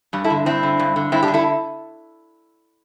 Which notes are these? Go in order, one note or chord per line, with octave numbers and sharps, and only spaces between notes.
G2 G3
E4 A4
D3
G2 C4 E4
D3
G2
D3
G2 C4 E4
D4 G4
D3
E4 A4